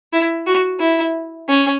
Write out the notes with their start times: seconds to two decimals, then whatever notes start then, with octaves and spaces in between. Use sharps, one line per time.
0.13 E4
0.46 F#4
0.80 E4
1.49 C#4